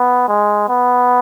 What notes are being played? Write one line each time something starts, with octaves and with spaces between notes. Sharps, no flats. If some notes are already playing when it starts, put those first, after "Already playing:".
Already playing: B3
G#3
B3